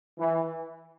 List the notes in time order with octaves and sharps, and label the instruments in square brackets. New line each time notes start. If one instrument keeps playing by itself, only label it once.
[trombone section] E3